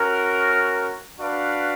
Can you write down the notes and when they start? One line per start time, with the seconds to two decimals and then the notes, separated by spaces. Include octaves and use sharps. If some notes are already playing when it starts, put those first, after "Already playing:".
Already playing: C#4 F#4 A#4
1.19 D4 F#4 B4 D5 F5